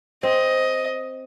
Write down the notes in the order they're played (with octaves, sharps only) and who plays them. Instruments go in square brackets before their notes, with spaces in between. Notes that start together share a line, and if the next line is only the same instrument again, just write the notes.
[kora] C4 [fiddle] D#5